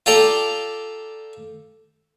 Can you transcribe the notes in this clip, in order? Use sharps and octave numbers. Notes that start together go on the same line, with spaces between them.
F4 G4 A4 D5 A#5